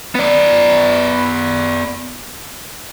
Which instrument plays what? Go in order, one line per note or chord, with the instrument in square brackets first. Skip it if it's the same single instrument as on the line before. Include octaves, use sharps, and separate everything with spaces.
[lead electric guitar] B3 D5